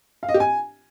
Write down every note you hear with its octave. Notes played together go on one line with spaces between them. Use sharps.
F5
D#5
G4
G#5